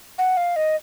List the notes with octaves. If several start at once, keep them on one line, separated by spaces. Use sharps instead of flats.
F#5
F5
D#5